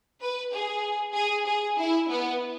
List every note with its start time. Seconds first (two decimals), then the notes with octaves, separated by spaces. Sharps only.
0.21 B4
0.53 G#4
1.15 G#4
1.46 G#4
1.78 E4
2.10 B3